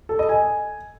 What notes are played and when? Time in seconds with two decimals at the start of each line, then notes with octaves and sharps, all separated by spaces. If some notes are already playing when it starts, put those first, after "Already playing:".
0.09 A4
0.19 D#5
0.29 G#5